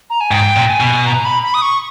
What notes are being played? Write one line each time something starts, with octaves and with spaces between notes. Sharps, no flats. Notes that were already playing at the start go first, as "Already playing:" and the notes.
A#5
G#5
G#2 G5
A#2
G#5
B2
A#5
B5
B5
D#6
C#6